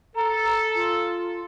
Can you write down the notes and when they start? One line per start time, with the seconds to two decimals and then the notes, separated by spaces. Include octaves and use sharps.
0.16 A4 A#5
0.74 F4